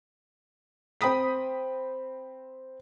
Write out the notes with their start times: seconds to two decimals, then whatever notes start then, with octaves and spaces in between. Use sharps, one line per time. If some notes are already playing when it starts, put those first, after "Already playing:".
1.01 C4 G5 B5 D#6 B6